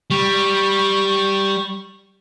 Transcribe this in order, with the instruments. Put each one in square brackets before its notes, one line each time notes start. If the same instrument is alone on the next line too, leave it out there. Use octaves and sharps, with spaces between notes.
[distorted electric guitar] G3 [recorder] C#6